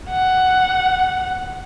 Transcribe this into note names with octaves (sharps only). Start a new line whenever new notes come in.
F#5